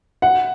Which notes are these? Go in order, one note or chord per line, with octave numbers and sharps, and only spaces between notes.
F#5